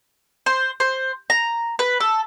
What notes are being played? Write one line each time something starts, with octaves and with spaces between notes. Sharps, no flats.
C5
C5
A#5
B4
A4